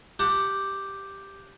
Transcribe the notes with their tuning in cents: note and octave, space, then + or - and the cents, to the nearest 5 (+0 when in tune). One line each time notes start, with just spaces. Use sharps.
G4 +0 F#5 +0 A5 +30